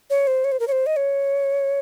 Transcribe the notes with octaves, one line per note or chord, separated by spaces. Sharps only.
C#5
C5
C#5
C5
A#4
C#5
C5
D#5
C#5